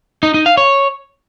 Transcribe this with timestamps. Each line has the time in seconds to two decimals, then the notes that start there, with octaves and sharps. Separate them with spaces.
0.23 D#4
0.34 D#4
0.46 F5
0.57 C#5